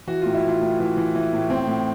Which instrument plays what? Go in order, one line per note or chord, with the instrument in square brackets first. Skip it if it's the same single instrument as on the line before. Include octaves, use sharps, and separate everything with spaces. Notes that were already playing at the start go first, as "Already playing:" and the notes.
[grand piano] E3 F#4
A2 F4
E4
E3 F4
A2
E3
E3
E3
A2
A2 C4
A2